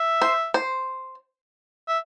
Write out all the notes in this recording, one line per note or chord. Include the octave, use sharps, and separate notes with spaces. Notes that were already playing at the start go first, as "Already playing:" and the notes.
Already playing: E5
C5
C5
E5